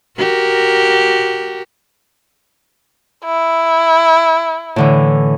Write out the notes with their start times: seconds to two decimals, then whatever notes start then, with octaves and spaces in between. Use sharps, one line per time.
0.18 F#4 G4 A#4
3.25 E4
4.76 A2 D3 E3